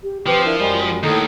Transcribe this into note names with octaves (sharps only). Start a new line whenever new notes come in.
G4
F3 C4 G4 B4
D4 E4 A#4
F#2 G3 G#3
D#2 A2 A4 A#4 D#5